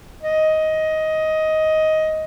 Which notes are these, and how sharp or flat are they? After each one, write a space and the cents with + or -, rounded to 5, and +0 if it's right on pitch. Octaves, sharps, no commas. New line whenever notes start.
D#5 +10